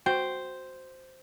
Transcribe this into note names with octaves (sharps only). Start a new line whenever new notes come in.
F#4 C5 G5